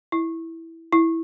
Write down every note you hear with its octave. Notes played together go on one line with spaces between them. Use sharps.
E4
E4